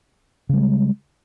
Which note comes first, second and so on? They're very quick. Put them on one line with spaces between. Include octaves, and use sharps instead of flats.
C#3 G3 G#3